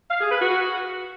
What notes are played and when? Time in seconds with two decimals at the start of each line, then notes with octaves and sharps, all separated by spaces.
0.11 F5
0.21 G#4
0.31 B4
0.42 F#4